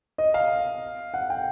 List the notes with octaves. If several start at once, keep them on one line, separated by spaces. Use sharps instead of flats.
D#5
F5
F#5
G5